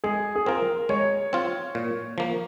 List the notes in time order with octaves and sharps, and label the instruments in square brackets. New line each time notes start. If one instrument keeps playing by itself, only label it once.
[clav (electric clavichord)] G#3 [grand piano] G#4
[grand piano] G#4
[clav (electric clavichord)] C4 F4 [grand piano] A#4
[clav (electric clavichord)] G#3 [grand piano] C#5
[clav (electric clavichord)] C4 F4
A#2
F3 A#3